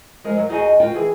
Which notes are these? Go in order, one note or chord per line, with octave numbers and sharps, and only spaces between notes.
F3 G#3 A#4
F#3
D#2 D#4 F#4 G#4 D#5 G#5
F4 F#4 A#4 G5
E3 G#4